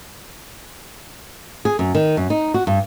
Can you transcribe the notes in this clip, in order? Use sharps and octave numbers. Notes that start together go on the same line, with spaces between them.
G#4
F#2
D#3
F#2
D#4
F#4
G2